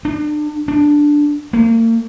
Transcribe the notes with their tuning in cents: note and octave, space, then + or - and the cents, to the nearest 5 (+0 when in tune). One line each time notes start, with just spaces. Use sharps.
D4 +35
D4 +0
A#3 -40